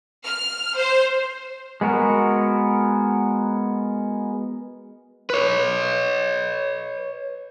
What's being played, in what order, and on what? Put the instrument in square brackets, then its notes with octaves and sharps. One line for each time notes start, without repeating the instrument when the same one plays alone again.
[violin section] F6
C5
[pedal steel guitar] G#3 B3 F#4 A#4
[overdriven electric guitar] B4 C#5